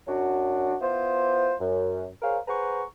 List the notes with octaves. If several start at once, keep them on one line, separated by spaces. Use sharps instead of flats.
F#2 F#3 D4 F#4
B3 E4 F4 C5
F#2
G#4 A#4 C5 C#5 F5
G#4 B4 C5 F#5 A#5 C#6